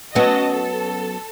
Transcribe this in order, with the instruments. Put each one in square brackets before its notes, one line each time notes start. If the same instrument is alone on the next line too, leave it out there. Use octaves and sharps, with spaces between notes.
[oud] F#3 B3 C#4 [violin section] F#4 D#5 A5
[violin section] A4